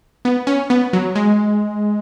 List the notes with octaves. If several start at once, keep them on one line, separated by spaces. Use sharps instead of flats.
B3
C#4
B3
F#3
G#3